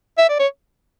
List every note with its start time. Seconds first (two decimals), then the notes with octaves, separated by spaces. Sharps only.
0.18 E5
0.29 D5
0.39 C#5